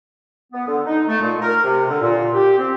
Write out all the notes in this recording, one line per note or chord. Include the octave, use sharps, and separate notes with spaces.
B3
D3
D#4
A3
A#2
A#4
C3
D3
A#2
G4
C4